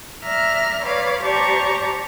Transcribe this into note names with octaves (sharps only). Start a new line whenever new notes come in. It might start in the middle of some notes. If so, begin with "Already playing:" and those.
D5 E5 A#5 F6
B4 C#5 D5 F5
G4 C5 D5 A5 A#5 C#6